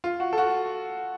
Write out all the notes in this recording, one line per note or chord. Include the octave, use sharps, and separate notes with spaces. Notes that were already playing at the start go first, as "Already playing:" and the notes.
F4
F#4
A4
F#4